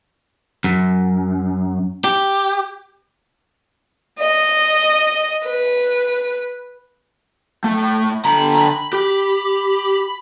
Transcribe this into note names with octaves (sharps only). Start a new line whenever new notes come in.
F#2
G4
D#5
B4
A2 A3
D3 A#5 B5
G4